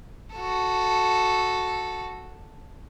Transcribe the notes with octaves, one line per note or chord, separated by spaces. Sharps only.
F#4 A4